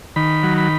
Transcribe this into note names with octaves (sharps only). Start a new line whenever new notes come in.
D#3 B5
F#3
B5